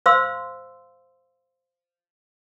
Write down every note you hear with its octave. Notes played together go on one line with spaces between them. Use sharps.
C5 F5 C6 E6